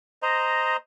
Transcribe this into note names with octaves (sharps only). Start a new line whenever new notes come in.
C5 D#5 A#5